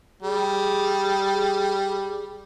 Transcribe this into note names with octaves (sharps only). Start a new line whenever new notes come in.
G3 G#4